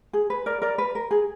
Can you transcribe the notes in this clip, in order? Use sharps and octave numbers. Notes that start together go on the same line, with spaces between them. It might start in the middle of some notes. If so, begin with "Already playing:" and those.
G#4
B4
A#4 D5
A#4 D5
B4
A#4
G#4